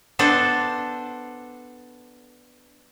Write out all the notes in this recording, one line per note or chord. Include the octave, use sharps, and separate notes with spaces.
B3 D4 A4 C5